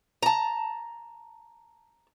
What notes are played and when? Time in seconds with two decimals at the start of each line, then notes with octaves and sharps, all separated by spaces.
0.23 A5 A#5